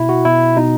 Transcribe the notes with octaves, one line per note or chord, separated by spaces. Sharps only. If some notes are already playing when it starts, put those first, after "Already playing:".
Already playing: B2 E4
F#4
B2 E4
B2 D#4